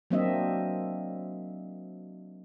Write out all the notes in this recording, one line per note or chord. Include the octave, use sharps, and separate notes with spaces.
F#3 A#3 C4 D4 D#5 E5